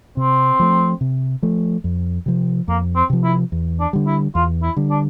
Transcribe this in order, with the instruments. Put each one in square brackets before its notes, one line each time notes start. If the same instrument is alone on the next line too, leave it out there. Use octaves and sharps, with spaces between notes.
[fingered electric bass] C3 [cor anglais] C4
[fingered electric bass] F3 A3
C3
F3 A3
F2
C3 F3
[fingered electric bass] F2 [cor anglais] A#3
[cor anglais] C4
[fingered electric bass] C3 F3
[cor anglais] E4
[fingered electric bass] E2
[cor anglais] D4
[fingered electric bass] D3 G3
[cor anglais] E4
[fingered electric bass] E2 [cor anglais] F4
[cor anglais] E4
[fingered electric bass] D3 G3
[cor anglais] D4